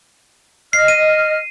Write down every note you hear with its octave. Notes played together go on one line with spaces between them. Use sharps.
D#5 F6 C7
D#7